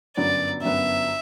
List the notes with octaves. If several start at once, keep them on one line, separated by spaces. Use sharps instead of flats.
G1 F#2 F#3 B3 D5
G1 F#2 F#3 B3 E5